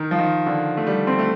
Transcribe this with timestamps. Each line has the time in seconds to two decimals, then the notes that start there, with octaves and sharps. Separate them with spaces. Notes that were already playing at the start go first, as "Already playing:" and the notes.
Already playing: D#3
0.11 F3
0.19 D#3
0.46 D3
0.77 A3
0.87 G3
1.07 C4
1.19 A3